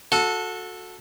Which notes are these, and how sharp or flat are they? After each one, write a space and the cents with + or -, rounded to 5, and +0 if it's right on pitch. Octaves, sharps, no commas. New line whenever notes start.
F#4 -25 A4 +0